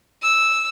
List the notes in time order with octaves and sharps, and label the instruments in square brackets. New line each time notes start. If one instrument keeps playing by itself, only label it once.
[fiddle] E6